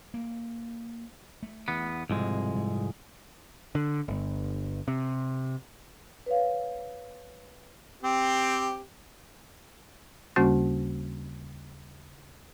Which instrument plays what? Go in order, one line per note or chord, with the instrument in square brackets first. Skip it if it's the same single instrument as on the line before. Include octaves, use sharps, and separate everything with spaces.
[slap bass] A#3
A3
[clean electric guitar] E2 B3
[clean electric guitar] C2 F2 G#3 [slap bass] G#2 B2
[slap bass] G#2
[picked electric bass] D3
G1
C3
[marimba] B4 C#5 F5
[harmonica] C4 G4
[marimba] D#2 C#3 G3 A#3 C#4 F#4